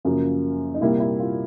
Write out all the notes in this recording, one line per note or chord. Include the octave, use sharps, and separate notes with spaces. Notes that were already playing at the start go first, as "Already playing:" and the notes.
F#2 C#3 F3 A#3 F4
D#4
C2 A#2 G3 A#3 E4
E4
F4